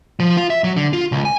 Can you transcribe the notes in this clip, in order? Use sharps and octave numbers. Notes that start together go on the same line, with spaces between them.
F3
F4
E5
F#3
D3
F4
C#2
G#5